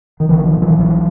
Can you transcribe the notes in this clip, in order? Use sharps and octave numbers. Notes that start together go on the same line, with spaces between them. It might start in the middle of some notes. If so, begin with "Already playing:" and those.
D#3
A#1 D3 E3
D#3 F3
A#2
E3 F#3
A#1 E3 F#3